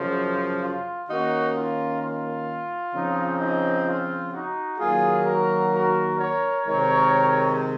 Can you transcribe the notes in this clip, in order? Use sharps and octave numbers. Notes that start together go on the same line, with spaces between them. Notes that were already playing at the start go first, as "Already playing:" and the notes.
Already playing: F#2 C#3 F3
F4
D#3 A#3 C#4 D#4 F#4
F4
F4
C#3 F3 C4 D#4
D#4
F4
D#4 F#4
D#3 F#3 A#3 F4 G#4
F#4 A#4
F#4 A#4
A#4 C#5
C3 D#3 G#3 C4 A#4 C#5